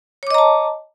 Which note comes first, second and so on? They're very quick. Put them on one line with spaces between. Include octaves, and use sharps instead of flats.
C#5 D6 D#5 A#5 A5